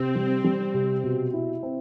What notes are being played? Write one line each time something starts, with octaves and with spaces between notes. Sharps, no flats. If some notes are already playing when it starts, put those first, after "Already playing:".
Already playing: C3 C4
G3
G3
C3
B2
E4
C4